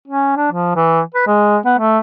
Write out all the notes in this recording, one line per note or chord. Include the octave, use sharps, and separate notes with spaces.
C#4
D4
F3
E3
B4
G#3
B3
A3